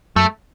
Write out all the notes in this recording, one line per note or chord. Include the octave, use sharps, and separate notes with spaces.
F#2 A3